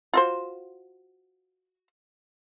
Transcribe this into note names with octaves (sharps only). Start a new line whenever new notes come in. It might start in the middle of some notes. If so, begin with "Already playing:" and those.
F4 F#4 C5